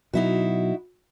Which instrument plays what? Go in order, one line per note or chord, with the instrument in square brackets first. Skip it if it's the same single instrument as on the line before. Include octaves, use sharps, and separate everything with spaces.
[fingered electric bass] B2 F#3 [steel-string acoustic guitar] D#4 E4 F#4